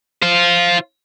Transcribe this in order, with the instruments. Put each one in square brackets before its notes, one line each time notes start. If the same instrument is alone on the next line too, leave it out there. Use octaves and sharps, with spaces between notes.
[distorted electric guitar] F4 C5